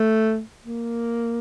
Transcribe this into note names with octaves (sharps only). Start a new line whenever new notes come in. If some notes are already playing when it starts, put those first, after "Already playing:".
Already playing: A3
A#3